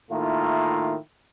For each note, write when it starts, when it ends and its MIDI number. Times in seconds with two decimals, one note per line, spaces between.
0.10 0.94 45
0.10 0.94 51
0.10 0.94 58
0.10 0.94 64
0.10 0.94 65